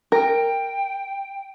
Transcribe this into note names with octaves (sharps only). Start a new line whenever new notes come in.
A#4 G5